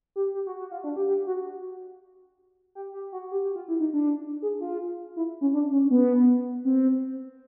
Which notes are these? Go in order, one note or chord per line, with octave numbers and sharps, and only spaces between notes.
G4
G4
F#4
F#4
F4
D4
G4
G4
F#4
G4
G4
F#4
G4
G4
F4
E4
D#4
D4
G#4
F4
E4
C#4
D4
C#4
B3
C4